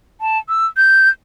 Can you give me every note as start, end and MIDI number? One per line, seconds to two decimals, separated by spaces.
0.21 0.38 81
0.49 0.66 88
0.77 1.09 91